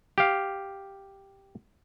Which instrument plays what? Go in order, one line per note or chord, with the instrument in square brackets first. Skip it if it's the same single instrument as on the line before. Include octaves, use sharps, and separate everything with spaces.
[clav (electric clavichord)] G4 F5